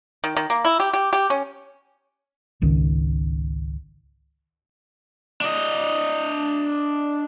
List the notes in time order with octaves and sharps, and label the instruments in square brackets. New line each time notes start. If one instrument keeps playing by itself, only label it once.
[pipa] D#3
D#3
A#3
E4
G4
G4
G4
C#4
[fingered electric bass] G#1 C#2 D#3
[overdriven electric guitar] D4 D#5